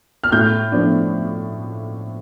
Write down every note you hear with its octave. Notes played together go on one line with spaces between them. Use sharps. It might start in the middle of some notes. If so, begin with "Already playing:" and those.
F6
A2 G6
F3 B3 D4